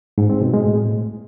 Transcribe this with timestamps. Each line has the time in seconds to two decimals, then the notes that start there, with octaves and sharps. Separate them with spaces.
0.18 G#2
0.30 C4
0.42 B2
0.54 G#3
0.66 A2